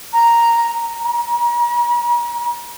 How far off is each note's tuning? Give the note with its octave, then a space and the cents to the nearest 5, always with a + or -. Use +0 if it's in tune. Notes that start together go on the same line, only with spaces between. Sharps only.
A#5 +0
A#5 +40